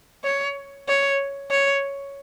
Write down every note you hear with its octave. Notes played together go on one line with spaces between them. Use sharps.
C#5
C#5
C#5